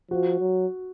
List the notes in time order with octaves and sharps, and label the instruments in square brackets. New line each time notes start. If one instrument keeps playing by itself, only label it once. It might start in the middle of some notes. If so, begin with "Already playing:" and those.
[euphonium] F3 [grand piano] F#4
[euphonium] F#3